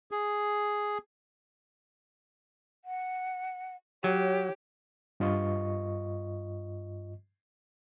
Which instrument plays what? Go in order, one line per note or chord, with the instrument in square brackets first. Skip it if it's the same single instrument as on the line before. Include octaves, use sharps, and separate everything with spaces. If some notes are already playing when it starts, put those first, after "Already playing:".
[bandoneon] G#4
[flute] F#5
[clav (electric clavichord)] F#3 [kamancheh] G4 [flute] C#5
[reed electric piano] G2 F4 D#5 C#6